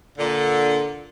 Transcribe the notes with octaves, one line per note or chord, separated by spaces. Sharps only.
A#2 D3